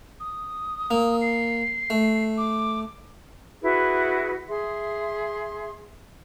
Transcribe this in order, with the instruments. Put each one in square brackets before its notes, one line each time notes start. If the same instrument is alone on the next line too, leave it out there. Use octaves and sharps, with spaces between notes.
[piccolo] D#6
[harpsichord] A#3
[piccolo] C7
[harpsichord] A3
[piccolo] D6
[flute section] E4 F#4 G#4 B4
G#4 E5 C6